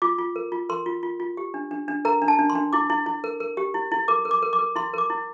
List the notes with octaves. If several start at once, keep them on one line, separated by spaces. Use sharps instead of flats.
F4 D6
F4
A#4
F4
A#4 C6
F4
F4
F4
G4
D4
D4
D4
A#4 A#5
D4
A5
D4
C6
D4
E4 D6
E4
E4
A#4
A#4
G4
E4
E4
A#4 D6
A#4
D6
A#4
D6
A#4
E4 C6
A#4 D6
E4